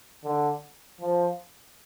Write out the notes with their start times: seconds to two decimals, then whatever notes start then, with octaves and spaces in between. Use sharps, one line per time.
0.24 D3
1.01 F3